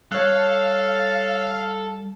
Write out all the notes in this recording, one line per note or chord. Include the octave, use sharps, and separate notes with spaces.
G3 A4 C#5 F5 F#6